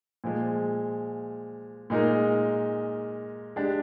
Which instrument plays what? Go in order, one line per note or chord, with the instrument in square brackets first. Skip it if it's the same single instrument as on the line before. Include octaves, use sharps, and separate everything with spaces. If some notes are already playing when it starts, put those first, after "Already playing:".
[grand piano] A#2 F3 G#3
A#2 G#3 D#4 A#4
G#3 D4 G4